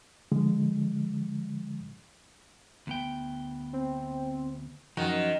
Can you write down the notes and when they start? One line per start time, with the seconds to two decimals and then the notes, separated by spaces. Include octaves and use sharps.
0.32 D3 F3 G#3
2.87 D2 B3 G5
3.73 C4
4.97 F#2 D#3 F3 F#4